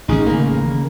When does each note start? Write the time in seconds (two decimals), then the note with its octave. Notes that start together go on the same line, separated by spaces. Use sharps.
0.08 A1 D#3 C#4 D#4 G#4
0.27 C#3 A#3